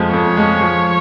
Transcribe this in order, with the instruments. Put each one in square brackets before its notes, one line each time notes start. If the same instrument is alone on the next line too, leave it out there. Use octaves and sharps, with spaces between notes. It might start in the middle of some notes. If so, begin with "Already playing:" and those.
Already playing: [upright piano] F2 F3 G#3
[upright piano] F2 [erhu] C#5
[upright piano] F3 G#3
F3